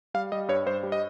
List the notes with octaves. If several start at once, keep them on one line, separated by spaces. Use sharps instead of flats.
G3 F5
G3 D#5
G2 C#5
G2 C5
G3
D#5